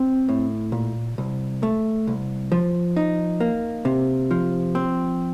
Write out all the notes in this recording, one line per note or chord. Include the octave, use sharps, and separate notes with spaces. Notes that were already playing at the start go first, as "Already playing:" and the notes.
Already playing: C4
A2
A#2
C2
A3
C2
F3
D#4
A#3
C3
F3
C4